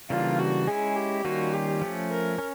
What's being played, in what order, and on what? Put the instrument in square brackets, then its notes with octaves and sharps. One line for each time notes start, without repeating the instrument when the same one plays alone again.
[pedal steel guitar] C#3 E3 G3 A#3 D4 [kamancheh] F4
[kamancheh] F#4
[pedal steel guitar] G#3 C#4 E4 [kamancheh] G#4
[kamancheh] G4
[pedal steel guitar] D#3 G3 A#3 C#4 F4 [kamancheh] F#4
[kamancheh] G4
[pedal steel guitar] F3 A3 C#4
[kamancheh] A#4
[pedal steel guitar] C#4